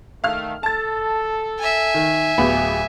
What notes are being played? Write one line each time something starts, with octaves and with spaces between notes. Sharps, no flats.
D#3 A3 F5 F6
A4 A5 A6
E5 G#5
D#3
D1 B3 G4 G#4 B5